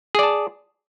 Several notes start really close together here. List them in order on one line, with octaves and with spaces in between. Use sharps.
G#4 D5 A5